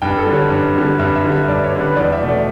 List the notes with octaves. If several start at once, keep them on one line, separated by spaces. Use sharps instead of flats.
G2 G5
A4
D3 G3
C#5
G2
D3 G3
G2 E5
E5
D3 G3
E5
G2 D5
C#5
D3 G3
B4
E2 D5
E5
B2 A3
D5